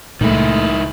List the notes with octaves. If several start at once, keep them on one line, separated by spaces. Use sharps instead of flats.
C#2 A#2 D#3 G#3 A3 E4